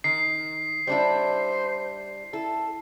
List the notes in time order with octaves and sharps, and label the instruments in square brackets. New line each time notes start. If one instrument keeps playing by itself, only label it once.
[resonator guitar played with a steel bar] D#3 [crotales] C7
[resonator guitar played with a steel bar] G3 D4 E4 [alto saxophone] C5
[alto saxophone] E4 [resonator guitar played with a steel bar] A4